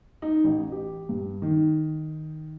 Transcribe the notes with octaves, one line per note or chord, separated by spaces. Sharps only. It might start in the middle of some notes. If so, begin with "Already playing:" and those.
D#4
A1
G4
G2
D#3